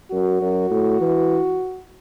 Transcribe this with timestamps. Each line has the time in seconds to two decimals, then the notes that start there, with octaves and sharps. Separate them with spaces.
0.11 F#2 F#4
0.41 F#2
0.71 A2
1.01 E3